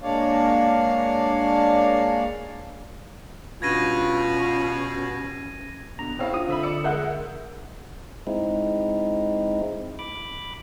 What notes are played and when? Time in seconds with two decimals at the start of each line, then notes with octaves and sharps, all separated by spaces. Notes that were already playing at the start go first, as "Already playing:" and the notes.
0.02 G#3 A#3 D4 C#5 D5 F5
3.62 G2 B2 C#4 F4 G#6 A#6 D#7
5.99 B2 D3 A#5
6.19 G#2 C4 C#4 E4 F5
6.33 D3 F4 D#6
6.49 D3 C4 E5 B5
6.63 D5 E6 C#7
6.84 A#1 G#3 A#4 E5 F#5 G6
8.27 G#3 C4 D#4 E4
9.99 B5 D6